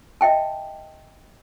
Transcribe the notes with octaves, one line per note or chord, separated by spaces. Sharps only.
D#5 E5 G5 A5